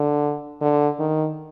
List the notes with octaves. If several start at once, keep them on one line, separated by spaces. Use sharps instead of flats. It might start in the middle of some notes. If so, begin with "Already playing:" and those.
Already playing: D3
D3
D#3